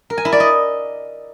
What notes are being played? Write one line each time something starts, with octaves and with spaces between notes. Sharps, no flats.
A#4
G#5
E4
D5
D#5